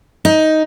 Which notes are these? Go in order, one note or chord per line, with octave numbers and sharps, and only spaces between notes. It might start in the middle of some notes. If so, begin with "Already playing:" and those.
D#4